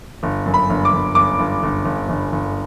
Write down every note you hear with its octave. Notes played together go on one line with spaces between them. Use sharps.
G1
F#2
B5
G1
D6
G1
G1 D6
G1
G1
G1
G1
G1